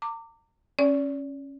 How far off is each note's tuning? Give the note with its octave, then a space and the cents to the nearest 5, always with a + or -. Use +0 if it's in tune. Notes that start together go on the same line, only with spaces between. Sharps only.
A#5 -40 D6 +0
C#4 -10 D5 -35